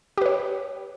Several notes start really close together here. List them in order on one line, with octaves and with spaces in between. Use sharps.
G4 B4 C#5